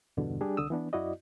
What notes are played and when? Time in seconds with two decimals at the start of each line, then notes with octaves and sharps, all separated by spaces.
0.17 E2 G2 B2 D3
0.41 G3 D4 G4 G#4
0.57 C2 D3 D#6 E6
0.70 E3 B3 D4
0.93 F#2 E4 F#4 D5 D#5